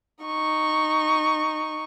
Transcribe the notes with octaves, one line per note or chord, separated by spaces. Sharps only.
D#4 C#6